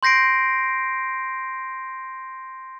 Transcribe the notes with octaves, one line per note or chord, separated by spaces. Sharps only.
C6 G6 A#6 C7 D7